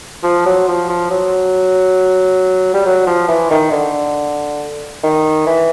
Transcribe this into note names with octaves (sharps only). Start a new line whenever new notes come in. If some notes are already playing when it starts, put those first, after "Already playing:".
F3
F#3
F3
F3
F#3
G3
F#3
F3
E3
D#3
D3
D#3
E3